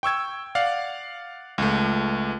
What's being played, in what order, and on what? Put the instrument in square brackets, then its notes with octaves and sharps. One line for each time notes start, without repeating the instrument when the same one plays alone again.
[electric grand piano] G5 C#6 E6 G#6
D5 F5 F#5
C#2 A3